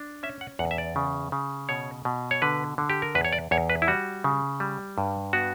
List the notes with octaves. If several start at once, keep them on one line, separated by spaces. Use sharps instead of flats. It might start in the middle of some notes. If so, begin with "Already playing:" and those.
Already playing: D4
C#4 E5
F#5
E2 F#5
E5
D5
C#3
C#3
B2 C#5
B2
C#5
D3 B4
D3
G4
A#4
E2 B4
C#5
D5
E2 C#5
B4
E4
G3 F#4
C#3
G3
G2
B3 F#4